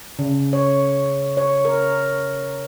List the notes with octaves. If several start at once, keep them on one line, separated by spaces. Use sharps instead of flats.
C#3
C#5
C#5
A#4